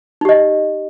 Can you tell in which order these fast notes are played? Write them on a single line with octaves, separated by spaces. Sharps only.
D#4 G4 D#5